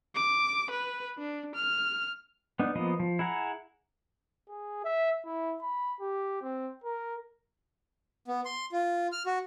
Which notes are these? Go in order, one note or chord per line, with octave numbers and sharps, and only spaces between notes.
D6
B4
D4
F6
B3 D4 D#4
F3 A#3 B3 D#5
F3
E4 G#4 F#5 A#5
G#4
E5
E4
B5
G4
C4
A#4
B3
C6
F4
F6
F#4